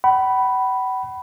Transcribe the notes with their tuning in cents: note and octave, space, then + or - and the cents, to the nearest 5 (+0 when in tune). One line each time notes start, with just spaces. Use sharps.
F#5 +45 B5 +0